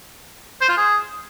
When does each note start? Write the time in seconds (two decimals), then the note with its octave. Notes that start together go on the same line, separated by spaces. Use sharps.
0.61 C5
0.69 F4
0.77 G#4